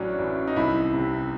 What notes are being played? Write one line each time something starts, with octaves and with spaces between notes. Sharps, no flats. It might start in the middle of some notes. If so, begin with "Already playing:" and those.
Already playing: A1 A2 F#3 C#4 D4
A1
D#4
C2 E4
C3